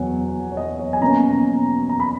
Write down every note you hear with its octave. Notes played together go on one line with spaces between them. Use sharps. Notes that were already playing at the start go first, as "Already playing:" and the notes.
Already playing: E2 B2 F#3 C#5 F#5 G#5
C#5
D#5
C#5
G#5
B2 A#3 C#4 A#5
A#5
B5